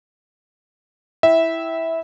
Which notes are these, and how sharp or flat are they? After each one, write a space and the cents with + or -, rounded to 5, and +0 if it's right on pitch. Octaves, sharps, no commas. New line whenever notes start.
E4 +0 E5 -15 G5 -15